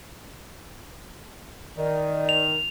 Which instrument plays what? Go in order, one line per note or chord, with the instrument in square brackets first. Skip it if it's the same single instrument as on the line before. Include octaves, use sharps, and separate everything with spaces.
[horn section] D#3 [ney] D5
[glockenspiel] F7